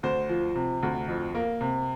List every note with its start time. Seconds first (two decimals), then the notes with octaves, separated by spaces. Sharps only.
0.03 D2 C5
0.29 F3
0.55 C3
0.83 D2
1.08 F2
1.35 A#3
1.61 C3